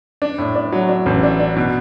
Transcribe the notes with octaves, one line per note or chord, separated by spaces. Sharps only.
D4
A2
D4
F#3
D4
A1
D4
D4
B2